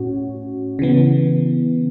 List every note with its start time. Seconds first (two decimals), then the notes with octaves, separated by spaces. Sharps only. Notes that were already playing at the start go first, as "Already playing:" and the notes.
Already playing: A2 C#4 F#4
0.79 C#3 E3 B3